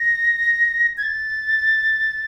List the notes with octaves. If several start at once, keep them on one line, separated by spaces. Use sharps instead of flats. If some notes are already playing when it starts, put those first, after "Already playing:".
Already playing: A#6
G#6
A6